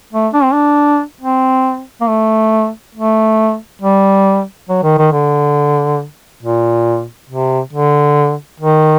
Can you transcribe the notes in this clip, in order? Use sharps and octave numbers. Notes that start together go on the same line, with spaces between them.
A3
D4
C4
D4
C4
A#3
A3
A3
G3
F#3
D#3
D#3
D3
A#2
C3
D3
D#3